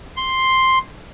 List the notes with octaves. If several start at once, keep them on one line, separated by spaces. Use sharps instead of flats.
C6